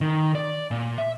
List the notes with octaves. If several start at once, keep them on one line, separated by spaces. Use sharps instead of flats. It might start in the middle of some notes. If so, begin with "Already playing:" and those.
D#3
D5
A#2
E5